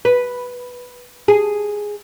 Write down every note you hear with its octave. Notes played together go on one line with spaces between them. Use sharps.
B4
G#4